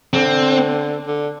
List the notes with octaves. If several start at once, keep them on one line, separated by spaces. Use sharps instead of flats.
D3 C4
D3